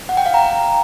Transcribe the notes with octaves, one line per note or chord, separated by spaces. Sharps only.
F#5
G5
F5
A#5